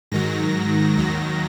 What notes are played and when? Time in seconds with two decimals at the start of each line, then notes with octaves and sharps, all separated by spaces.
0.12 G#2 D#3 F#3 A#6
0.97 D#2 D#3 F#3 A#6